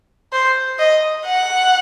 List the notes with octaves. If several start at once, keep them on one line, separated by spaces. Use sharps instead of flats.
C5
D#5
F#5